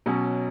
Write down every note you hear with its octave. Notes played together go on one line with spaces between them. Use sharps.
B2 F#3 C#4